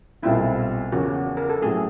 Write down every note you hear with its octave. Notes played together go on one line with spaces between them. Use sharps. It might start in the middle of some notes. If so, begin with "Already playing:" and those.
B1 A#2 G3 C4 E4 F4
E2 C#3 F3 A#3 C#4 F#4
A#4
A4
A2 F#3 A3 C#4 G#4